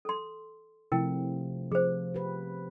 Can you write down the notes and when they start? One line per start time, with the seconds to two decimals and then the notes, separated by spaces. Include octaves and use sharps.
0.05 A4 C6
0.92 C3 F3 A3 E4 A#4 G5
1.72 F3 G#4 C5
2.14 G4 B4